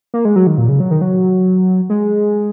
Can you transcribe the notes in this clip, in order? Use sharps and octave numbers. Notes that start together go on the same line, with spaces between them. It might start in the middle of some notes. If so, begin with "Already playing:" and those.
A#3
G#3
F#3
D#3
A#2
C#3
F#3
D#3
F#3
G#3